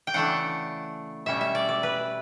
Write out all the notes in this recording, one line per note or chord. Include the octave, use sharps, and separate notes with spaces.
G5
C#3 E3 A3 D4 F#5
B2 G3 C#4 E5
E5
D5
D5
B4